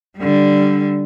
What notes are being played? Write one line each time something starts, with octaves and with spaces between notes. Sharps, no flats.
D3 G3